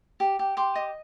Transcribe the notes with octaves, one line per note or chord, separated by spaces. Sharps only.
G4
G4
G4 C6 D6
D#5